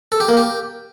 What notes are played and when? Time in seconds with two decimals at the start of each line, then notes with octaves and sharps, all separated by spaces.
0.12 A4
0.20 G4
0.29 A#3
0.37 G4